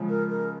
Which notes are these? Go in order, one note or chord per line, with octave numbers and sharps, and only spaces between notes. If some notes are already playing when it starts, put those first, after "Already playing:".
Already playing: C#3 F3 G#3 C#4
A#4
A#4